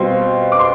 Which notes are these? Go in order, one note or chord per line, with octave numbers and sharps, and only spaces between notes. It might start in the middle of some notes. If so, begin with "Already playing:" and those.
Already playing: B2 G3 C4 F4 C6
D6
C6